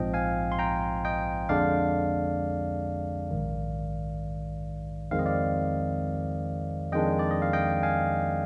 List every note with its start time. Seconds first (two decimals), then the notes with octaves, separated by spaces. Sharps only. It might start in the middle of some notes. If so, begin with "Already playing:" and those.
Already playing: A#1 G#2 F3 C4 D#5 G5
0.14 F5 G#5
0.52 C6
0.59 G5 A#5
1.05 D#5 G5
1.49 F2 D3 G#3 D4 D5 F5
3.31 A#1 G#2 D#3
5.11 F2 D#3 G#3 C4 F5
5.19 D#5
5.26 D5 F5
6.92 F2 D#3 G#3 D4 D#5 G5
7.19 D5
7.31 D#5
7.42 F5
7.53 D#5 G5
7.83 F5 G#5